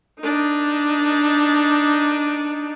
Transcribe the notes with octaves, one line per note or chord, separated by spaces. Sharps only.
D4 D#4